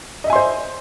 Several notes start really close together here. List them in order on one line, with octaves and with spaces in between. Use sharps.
D#5 E5 G#5 C6 C5